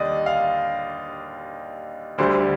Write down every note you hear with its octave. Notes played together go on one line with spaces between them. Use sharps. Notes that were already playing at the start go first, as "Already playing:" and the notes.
Already playing: D#2 D3 G3 A#3 D5 D#5
F5
D2 D3 G3 C5